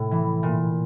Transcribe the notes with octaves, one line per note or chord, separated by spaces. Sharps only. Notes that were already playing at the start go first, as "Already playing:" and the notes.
Already playing: A2 C3
E3
A#2